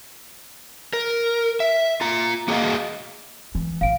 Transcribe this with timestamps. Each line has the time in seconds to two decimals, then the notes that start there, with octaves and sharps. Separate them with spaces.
0.93 A#4
1.60 E5
2.01 F4 A#5
2.48 A#3 F#4 G#4 B4 D#5 F5
3.55 E3
3.81 A1 F5 D7